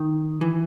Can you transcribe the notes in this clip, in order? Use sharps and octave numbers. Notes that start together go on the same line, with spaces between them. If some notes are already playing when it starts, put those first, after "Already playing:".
Already playing: D#3
E3